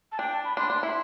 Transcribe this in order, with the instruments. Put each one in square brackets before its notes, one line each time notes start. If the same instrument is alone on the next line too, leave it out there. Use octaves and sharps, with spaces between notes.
[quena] A5
[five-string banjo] D4 [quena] G5
[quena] A5
B5
[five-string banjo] D4 [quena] C6
[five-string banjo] D4
[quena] C6
[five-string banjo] E4